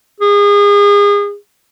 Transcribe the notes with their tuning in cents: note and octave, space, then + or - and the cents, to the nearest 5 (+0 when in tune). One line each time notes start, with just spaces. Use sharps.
G#4 -30